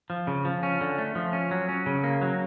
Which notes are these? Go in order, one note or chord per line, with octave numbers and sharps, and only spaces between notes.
F3
C#3
F3
C#4
D3
A3
F3
C#4
F#3
C#4
C#3
A#3
F#3